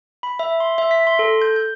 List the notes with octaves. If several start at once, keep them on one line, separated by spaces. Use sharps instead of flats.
B5
E5
C6
E5
B6
C6
A4
G6
G6